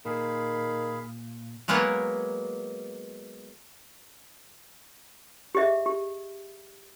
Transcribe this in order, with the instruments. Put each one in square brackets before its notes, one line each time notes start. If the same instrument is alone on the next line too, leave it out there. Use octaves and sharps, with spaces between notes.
[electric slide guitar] A#2 [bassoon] D#3 [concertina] G#4 F5 B5
[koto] F#3 G#3 A#3 B3 A#4 C#5
[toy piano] G4 G#4 D#5 E5
G4